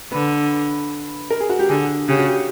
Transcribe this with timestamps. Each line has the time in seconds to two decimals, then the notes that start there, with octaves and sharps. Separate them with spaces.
0.12 D3 B4
1.31 A#4
1.40 G#4
1.50 F#4
1.59 G4
1.69 D3 G#4
2.08 C#3 G4
2.18 F#4
2.28 G4